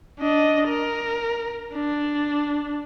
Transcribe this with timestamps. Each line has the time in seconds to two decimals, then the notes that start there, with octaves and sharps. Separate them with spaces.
0.20 D4 D#5
0.68 A#4
1.74 D4